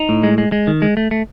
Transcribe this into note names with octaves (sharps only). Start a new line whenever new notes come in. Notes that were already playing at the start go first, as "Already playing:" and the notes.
Already playing: D#4
A2
G#3
G#3
G#3
D#3
G#3
A3
A3